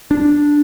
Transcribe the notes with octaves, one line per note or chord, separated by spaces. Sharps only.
D4